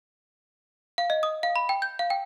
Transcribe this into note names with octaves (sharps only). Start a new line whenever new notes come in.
F5
D#5
D#6
F5
B5
G5
G6
F5
G5